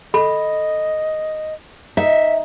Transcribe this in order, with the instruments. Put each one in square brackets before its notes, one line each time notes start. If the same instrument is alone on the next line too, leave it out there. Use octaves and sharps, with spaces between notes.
[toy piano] A4 B5 [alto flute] D#5
[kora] D#4 [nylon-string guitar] E5